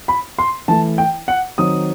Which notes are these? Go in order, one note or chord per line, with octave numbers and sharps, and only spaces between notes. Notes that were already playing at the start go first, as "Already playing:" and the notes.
B5
C6
E3 A3 E4 A5
G5
F#5
D#3 F#3 C4 D#4 D#6